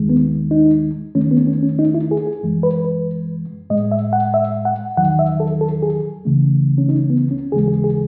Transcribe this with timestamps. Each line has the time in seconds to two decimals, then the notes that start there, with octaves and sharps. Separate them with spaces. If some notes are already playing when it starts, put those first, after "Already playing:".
Already playing: D#2 D#3 G#3
0.09 B3
0.51 D#4
1.15 E2 D#3 A3 C#4
1.31 B3
1.47 C#4
1.63 C#4
1.79 D#4
1.94 E4
2.11 G#4
2.27 G#4
2.43 F#2 E3 G#3
2.63 B4
2.84 B4
3.70 A2 G#3 D#5
3.92 E5
4.13 F#5
4.34 E5
4.65 F#5
4.97 E2 D#3 F#3 F#5
5.19 E5
5.40 A4
5.61 A4
5.83 G#4
6.25 C#2 C#3 E3 A3
6.78 C#4
6.89 D#4
7.10 B3
7.31 C#4
7.52 D#2 C#3 E3 G#3 G#4
7.68 G#4
7.84 G#4